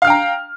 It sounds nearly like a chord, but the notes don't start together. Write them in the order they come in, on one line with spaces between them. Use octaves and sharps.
F5 F6 G5 A#5